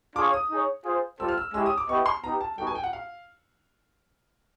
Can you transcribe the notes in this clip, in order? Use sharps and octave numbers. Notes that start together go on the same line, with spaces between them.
D4 F4 G#4 C#5 F5 D6
D#6
D#4 G#4 C#5
F4 G#4 C5
G3 C4 F4 A4 C5 E6
F6
E6
G#3 C#4 E4 G4 E6
D#6
D6
B3 E4 G4 B4 D#5 C#6
C6
B3 D#4 G4 A#5
A5
G3 B3 D#4 F#4 A4 G5
G#5
G5
F#5
F5